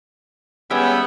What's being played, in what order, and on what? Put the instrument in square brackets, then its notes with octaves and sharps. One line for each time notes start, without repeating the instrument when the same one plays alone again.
[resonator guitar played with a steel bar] G3 G#3 C#4 [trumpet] B3 [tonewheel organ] E5 G5